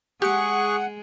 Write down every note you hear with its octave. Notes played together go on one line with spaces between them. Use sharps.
G#3 G4 G#4 F#5 C#6 F#6 C#7